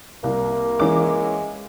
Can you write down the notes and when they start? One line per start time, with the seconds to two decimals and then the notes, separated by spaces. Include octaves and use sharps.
0.24 C2 A#3
0.80 E3 G#3 C#4 D6